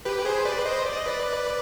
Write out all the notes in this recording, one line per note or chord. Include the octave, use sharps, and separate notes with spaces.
G4 B4
G#4 C5
B4 D5
C5 D#5
D5
D#5
B4 D5